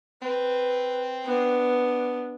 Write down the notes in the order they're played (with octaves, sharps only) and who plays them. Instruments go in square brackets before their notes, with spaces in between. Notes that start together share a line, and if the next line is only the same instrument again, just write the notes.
[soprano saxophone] C4 [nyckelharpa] B4
[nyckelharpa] B3 D4